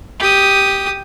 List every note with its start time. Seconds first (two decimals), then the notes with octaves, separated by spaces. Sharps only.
0.20 G4 D#6